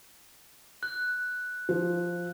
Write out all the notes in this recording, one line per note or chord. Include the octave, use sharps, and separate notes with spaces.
F#6
F3